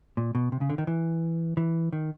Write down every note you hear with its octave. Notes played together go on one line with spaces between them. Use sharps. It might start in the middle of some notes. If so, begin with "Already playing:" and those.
A#2
B2
C3
C#3
D3
D#3
E3
E3
D#3